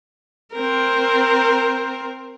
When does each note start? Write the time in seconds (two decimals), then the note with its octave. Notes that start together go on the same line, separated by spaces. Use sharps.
0.53 C4 A#4